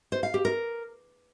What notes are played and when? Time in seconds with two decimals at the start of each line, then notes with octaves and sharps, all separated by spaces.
0.12 C5
0.23 F5
0.34 G4
0.45 A#4